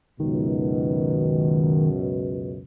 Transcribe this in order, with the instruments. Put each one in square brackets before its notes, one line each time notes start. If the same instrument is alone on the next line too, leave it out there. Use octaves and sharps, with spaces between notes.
[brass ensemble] C#2 F#2 B2 [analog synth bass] D#3